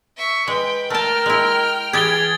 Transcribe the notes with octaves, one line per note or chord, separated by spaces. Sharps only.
E5 C#6
G#3 B4 G5
A3 A#4 G5 A5 F6
G#3 E4
E3 G4 G#4 G#6 A6 G7